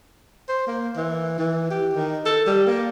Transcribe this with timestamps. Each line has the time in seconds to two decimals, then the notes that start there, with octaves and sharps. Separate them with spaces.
0.49 C5
0.67 A#3
0.97 E3
1.38 E3
1.70 G4
1.94 D#3
2.26 A4
2.47 G3
2.67 A#3